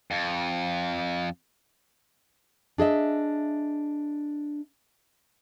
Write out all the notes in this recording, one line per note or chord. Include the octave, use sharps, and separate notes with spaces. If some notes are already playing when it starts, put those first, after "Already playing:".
F2
D4 G#4 D#5 E5